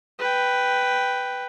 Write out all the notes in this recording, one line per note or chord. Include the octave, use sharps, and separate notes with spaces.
B4 G5